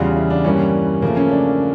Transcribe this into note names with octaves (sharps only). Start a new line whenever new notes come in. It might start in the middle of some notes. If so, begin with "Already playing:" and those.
Already playing: E2 C#3 G3 F4
E4
D4
G2 E3 G3 A#3 C#4
C#3 F3 A3 A#3
C#4
D4